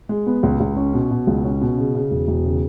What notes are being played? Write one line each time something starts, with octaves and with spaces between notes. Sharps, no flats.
G#3
B3
C#2
C#2
C#4
B2
B2
C#2
C#4
B2
C#3
C#3
E1
E1
C#3